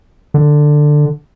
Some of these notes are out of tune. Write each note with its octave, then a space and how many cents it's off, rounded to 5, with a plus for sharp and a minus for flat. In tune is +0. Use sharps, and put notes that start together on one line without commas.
D3 +10